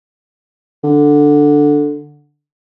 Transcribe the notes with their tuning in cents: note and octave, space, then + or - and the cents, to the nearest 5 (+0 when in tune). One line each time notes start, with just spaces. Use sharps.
D3 +0